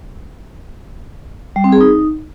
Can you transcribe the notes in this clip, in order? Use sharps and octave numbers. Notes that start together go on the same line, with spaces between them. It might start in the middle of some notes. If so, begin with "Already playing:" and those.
G3
C4
G#4
D#4